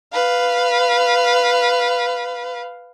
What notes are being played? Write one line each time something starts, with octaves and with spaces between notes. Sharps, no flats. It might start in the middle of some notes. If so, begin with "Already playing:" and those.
B4 F5